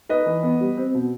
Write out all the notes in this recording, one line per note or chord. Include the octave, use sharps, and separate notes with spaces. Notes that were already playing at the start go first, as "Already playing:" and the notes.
D#4 B4 D#5
E3
B3
G3
C4
B2